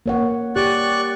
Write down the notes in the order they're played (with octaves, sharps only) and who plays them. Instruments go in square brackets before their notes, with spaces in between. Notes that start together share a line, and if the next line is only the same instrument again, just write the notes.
[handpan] A#3 C#5 F#5
[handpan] G4 [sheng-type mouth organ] D5 C#6 F#6